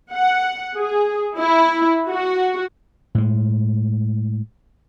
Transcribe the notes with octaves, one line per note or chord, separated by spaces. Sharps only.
F#5
G#4
E4
F#4
A2 G#3